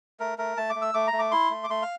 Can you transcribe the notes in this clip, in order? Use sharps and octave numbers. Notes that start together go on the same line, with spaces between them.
A3 A#4
A3 A#4
A3 A5
D6
A3
E6
A3 D6
A#5
A3
D6
E4 C6
A3
D6
A3 C6
F5